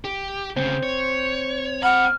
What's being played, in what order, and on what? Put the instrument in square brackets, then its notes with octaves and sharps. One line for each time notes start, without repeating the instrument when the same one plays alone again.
[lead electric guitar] G4
[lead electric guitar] D2 C#3 [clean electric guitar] C4 [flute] C5
[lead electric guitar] C#5
[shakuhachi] F#5 [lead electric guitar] G5 B5 [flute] F6